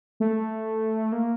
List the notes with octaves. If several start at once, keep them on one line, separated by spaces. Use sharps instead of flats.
A3
A#3